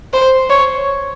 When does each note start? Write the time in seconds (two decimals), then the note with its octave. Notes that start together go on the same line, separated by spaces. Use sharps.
0.13 C5
0.50 C#5